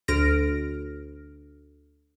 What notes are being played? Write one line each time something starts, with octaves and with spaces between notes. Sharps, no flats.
D2 F6 A#6 D7